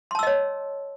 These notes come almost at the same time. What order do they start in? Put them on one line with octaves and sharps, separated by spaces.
C6 A5 E6 D#5 C#5